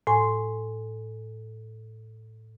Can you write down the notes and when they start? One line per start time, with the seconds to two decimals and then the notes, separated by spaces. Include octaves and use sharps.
0.07 A2 G#5 C6